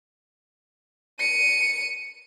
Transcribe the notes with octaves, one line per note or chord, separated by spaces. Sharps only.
C#7 D#7